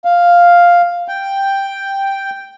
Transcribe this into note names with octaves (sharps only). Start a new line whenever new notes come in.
F5
G5